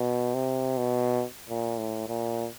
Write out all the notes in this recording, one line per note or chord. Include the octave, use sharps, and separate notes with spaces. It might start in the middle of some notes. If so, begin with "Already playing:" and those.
Already playing: B2
C3
B2
A#2
A2
A#2